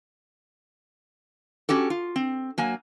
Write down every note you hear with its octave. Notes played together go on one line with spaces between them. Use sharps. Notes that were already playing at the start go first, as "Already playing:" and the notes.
C#4 F#4 G4 A4
F4
C4
F#3 A#3 G#5